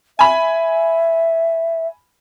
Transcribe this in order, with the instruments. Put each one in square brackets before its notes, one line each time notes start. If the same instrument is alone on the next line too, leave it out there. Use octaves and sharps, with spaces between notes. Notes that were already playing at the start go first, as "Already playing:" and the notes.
[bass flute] E5 [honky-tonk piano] G#5 B5